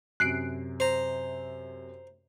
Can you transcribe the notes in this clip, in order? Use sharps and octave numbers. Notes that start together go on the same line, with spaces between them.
F#2 C3 F#6 C7 D7
C5 A#5